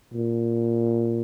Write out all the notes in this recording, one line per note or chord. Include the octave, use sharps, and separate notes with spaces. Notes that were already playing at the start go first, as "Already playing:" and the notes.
A#2